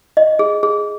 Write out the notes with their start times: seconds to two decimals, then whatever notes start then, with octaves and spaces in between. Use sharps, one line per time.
0.17 D#5
0.39 G#4
0.63 G#4